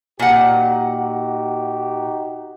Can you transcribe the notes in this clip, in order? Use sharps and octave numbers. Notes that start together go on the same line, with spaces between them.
A#2 D#4 F#4 G4 F#5